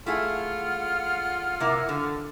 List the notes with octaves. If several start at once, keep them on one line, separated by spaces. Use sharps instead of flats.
A3 E4 F4 G#4 F#5 F6
C3 A#3 E4
D3